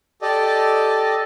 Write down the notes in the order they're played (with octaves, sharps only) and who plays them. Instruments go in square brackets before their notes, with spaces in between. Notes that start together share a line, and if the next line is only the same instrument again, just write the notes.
[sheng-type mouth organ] G4 A4 D5 D#5